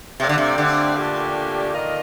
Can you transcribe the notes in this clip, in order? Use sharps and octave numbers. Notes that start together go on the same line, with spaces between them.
C3 A3 C4 G4 D5 F5
D3
C3
D3
A#2 A3 D4 G4
D#3 A#3 F4 A#4 D#5